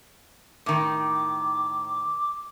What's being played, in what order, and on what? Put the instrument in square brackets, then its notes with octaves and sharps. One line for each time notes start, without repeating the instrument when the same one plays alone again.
[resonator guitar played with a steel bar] A2 D#3 [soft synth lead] D6